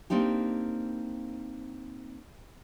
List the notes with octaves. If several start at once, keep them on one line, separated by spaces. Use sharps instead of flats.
A#3 C4 D4 D#4 G4